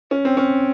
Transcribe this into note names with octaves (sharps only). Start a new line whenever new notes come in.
C#4
C4
C#4